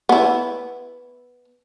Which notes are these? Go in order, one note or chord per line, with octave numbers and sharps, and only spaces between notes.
B3 E4